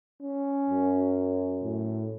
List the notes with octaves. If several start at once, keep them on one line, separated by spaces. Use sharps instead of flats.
C#4
F#2
A2